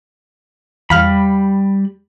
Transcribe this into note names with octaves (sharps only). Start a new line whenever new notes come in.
E2 G3 F5 B5 F6